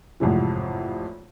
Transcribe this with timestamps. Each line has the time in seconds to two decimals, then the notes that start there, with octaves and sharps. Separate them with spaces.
0.20 G#1 F2 A2 C3 E3